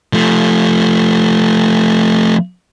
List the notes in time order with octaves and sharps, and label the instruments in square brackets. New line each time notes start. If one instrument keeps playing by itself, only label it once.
[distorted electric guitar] F3 A3